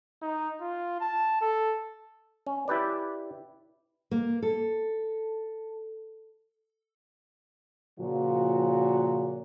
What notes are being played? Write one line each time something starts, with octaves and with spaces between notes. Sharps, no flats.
D#4
F4
A5
A4
C#4
E4 G4 B4 D5
A#3
A4
A#2 C#3 F3 F4 F#4